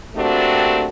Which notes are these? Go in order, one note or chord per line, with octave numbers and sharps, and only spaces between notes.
A3 A#3 C4 D4 F#4 G4